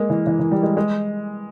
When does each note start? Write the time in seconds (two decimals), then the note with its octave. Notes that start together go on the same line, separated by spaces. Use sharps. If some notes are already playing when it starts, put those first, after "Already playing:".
Already playing: G#3 A#3
0.10 E3
0.27 E3
0.39 E3
0.51 G3
0.63 G#3
0.77 G#3